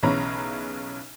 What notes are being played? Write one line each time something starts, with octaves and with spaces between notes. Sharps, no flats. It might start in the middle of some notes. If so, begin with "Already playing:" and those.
B1 C#3 E3 C#5 A#5 B5